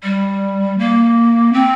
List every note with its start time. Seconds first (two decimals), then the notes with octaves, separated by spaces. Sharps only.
0.04 G3
0.78 A#3
1.53 C4